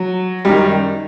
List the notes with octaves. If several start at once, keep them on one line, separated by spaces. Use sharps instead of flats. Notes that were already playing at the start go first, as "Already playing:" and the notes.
Already playing: F#3
F#2 D#3 G3